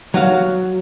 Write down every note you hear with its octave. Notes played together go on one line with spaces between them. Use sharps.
F#3 F#4 F5